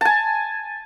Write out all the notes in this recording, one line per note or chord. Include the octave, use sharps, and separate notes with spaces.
G#5 A5